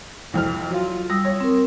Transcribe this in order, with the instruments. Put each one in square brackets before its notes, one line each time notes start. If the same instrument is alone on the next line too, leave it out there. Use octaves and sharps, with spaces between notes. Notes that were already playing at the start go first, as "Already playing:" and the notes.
[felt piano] C2 F2 F6
F#3 F4
[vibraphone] G3 D#6 E6 [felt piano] A#6
[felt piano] C#5
[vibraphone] C4 A#4